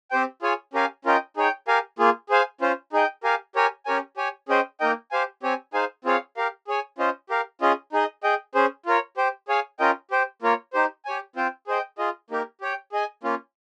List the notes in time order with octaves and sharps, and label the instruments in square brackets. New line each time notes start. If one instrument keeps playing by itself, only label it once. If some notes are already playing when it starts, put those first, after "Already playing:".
[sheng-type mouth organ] C4 G4 C5 G5
F4 G#4 C#5 G#5
C#4 G4 A#4 F5 G#5
C#4 F4 A#4 D#5 G5
D#4 G#4 C#5 G5
G4 A#4 F5 G#5
A#3 F4 G#4
G#4 C5 F5 G#5
C#4 F4 C5
D#4 G#4 D#5 G5
G4 A#4 F5 G#5
G4 A#4 C#5 G#5
C#4 G4 A#4 C#5 G#5
G4 C#5 G#5
C#4 G#4 C5 D#5 G5
A#3 D#4 A#4 D#5 G5
G4 C5 F5 G#5
C4 G4 C#5 G#5
D#4 G#4 C5 F5 G#5
C4 F4 G#4 C#5 F5
G4 A#4 F5
G#4 C#5 G#5
C#4 F4 C5 D#5
G4 A#4 F5
C#4 F4 G#4 D#5
D#4 G#4 D#5
G#4 D#5 G5
C#4 G#4 C5
F4 A#4 C#5
G4 C5 G5
G#4 C#5 F5 G#5
C#4 F4 A#4 D#5 G5
G4 C5 G5
A#3 F4 A#4 C#5
D#4 G4 C5
G4 C#5 G#5
C4 F4 C5 G5
G#4 C5 D#5 G5
F4 G#4 D#5
A#3 D#4 G4 A#4
G4 C#5 G5
G#4 D#5 G#5
A#3 C#4 F4